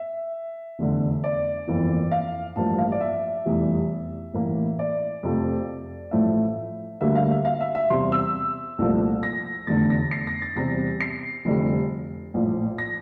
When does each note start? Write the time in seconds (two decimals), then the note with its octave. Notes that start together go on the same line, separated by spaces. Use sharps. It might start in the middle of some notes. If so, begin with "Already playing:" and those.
Already playing: E5
0.79 F1 E2 D3
1.24 D5
1.68 G1 F2 E3 A#3
2.11 F5
2.56 A1 G2 F3 A#3 A5
2.78 F5
2.92 D5
3.01 E5
3.46 F1 E2 E3 G3
4.34 A1 A2 E3 A#3
4.79 D5
5.23 F2 C3 F3 A3
6.11 A1 A2 F3 A3 E5
7.01 D2 D3 G3 A#3 E5
7.16 F5
7.31 E5
7.45 F5
7.61 E5
7.75 E5
7.90 E2 C3 G3 C6
8.12 E6
8.78 C2 A#2 F3 A3
9.23 A#6
9.67 F1 E2 D3 A3 A6
9.90 A#6
10.11 C7
10.27 A#6
10.42 A6
10.56 E2 C3 G3 A#6
11.00 C7
11.45 F1 F2 D3 G3
12.34 A#1 A2 F3
12.78 A#6